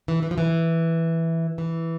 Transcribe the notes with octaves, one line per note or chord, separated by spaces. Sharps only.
E3
E3
F3
E3
E3